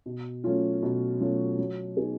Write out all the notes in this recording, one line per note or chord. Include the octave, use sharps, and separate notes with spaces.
B2
F#3 A3 C#4 F4
B2
F#3 A3 C#4 F4
F#3
B3 D#4 G#4